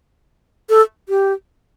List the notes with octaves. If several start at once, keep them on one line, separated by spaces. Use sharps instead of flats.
A4
G4